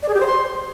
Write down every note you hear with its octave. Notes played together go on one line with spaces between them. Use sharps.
D5
G#4
G4
C5
C6